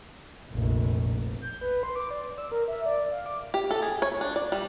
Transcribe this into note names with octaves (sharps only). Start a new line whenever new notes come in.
F1 A#1
G6
B4
C6
D6
D5
E6
A#4
E5
D5
F5
D6
G4
A4
G#4
C#5
D4
D5
G3